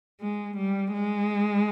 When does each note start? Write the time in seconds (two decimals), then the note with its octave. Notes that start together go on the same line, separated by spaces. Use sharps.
0.21 G#3
0.57 G3
0.93 G#3